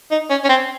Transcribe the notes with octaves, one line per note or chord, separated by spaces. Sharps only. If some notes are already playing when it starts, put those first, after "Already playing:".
D#4
C#4
C#4
C4